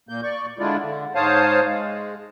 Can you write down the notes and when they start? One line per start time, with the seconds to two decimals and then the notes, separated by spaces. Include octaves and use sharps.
0.09 A#2 A#3 G6
0.23 D5 C#6
0.59 D3 G#3 D4 E4 F4 D5
0.82 D3
1.15 G#2 C5 C#5 F5 A5 D#6
1.66 G#3